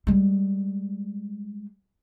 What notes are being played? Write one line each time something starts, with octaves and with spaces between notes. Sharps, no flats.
G3 G#3